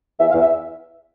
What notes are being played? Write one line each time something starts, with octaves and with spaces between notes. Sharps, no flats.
E2 E5
F5
E2
E5